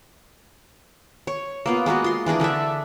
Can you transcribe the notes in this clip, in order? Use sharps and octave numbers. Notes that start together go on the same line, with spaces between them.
C#5
A#3 B3 F4
G#3 A#3 B3 F#4
F4 C6
E3 D4 G#4 A#4
D3 D4 A4 E5